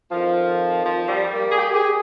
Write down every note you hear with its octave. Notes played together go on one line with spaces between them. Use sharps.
F2 D#3 F3
F3
G3
A#3
G#4
G4
G4
G#4